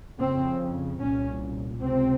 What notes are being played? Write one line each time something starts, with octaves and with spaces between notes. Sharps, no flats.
F2 C#3 C4
C2 A#2 C#4
C#2 C3 C4